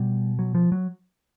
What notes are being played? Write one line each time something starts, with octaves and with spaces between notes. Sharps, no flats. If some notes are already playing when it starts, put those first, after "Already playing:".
Already playing: B2 G3
F#3
F3
F#3